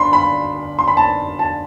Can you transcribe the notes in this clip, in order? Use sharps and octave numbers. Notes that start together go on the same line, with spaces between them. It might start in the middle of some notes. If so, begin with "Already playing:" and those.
Already playing: D4 B5 C6
B5
C6
B5
A5
A5